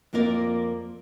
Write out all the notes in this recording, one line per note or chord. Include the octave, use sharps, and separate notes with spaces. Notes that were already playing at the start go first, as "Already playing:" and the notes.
F2 A#3 F4 A#4 D5